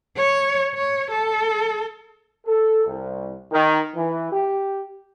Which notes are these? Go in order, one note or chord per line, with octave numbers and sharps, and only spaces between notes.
C#5
C#5
A4
A4
C2
D#3
E3
G4